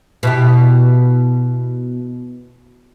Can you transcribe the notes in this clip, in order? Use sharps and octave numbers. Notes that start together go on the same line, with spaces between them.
B2 E4 G4